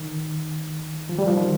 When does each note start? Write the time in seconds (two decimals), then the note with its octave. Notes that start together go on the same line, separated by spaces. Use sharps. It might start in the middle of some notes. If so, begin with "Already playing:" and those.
Already playing: D#3
1.09 F3
1.19 G3
1.27 F3
1.37 D#3